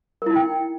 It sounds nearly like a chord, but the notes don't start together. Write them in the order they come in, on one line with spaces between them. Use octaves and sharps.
A#4 E4 D#4 G5